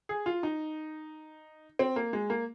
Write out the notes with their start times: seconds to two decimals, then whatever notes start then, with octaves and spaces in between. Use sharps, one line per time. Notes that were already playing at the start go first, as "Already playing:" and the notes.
0.09 G#4
0.26 F4
0.43 D#4
1.79 C4
1.96 A#3
2.13 G#3
2.30 A#3